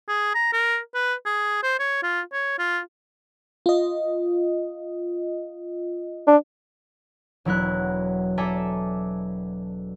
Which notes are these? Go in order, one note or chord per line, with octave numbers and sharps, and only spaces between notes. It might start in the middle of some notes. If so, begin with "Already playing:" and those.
G#4
A#5
A#4
B4
G#4
C5
C#5
F4
C#5
F4
F4 D#5
D4
E1 F#3 E4 A#4 F#6
A4 D5 E5 G#5 A#5 D6